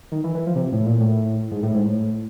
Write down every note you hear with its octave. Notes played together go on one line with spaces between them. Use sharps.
D#3
E3
E3
F3
C3
A2
A#2
A2
G#2
A2
G#2
A2